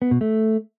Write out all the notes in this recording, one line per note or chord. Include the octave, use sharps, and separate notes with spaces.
B3
B2
A3